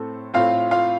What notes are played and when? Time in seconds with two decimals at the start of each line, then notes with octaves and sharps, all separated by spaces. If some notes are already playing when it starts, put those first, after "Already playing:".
Already playing: A2 A3 C4 A4
0.34 A2 A3 C4 F4 F5
0.71 F4 F5